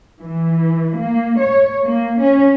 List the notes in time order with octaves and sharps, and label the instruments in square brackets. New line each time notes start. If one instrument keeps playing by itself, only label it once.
[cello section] E3
A#3
C#5
A#3
C#4